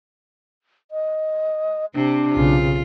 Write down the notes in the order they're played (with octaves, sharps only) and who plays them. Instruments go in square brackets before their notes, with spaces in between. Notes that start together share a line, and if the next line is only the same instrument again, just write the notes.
[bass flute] D#5
[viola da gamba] C3 C4 [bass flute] D4
[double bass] B1 C#3 [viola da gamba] F4